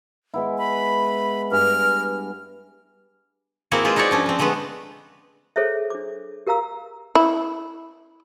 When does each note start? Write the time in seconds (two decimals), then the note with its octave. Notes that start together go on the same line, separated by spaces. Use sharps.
0.34 G#3 B3 E4
0.58 B5
1.51 G2 G#5 D6 F6
3.71 A#3 C4 E4 F#4 G#4
3.85 G#3 F4 B4 C5
3.96 D#4 E4 F#4 C#5 D5
4.11 F3 C#4 D4
4.26 F3 C4
4.39 D3 G#3 A3 B3 B4
5.56 G#4 A4 C5 C#5 E5
5.90 D4 D6
6.47 G4 A#4 F5 A#5 E6
7.15 E4